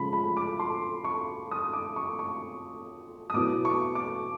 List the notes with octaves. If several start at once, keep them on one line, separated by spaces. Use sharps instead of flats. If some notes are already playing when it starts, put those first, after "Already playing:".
Already playing: C#3 F3 G#3 B5
B5
D6
C6
C#6
D#6
D6
C#6
C#6
D#6
B2 F#3 B3 E4 D6
C#6
D6